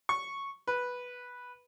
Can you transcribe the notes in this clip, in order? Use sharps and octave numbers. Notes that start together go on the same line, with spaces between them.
C#6
B4